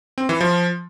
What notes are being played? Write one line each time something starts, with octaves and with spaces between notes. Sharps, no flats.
C4
E3
F3